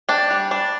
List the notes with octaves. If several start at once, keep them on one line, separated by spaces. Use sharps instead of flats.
D4 G5
G3
D4